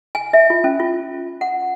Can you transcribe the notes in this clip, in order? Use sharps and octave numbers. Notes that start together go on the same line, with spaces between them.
G#5
E5
F4
C#4
F4
F#5